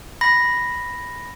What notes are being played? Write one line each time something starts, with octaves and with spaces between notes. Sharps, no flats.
B5 A#6